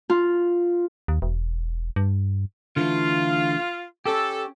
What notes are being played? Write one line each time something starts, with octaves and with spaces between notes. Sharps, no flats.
F4
D#2
E1
G2
D3 E3 A3 F4
C#4 G4 A4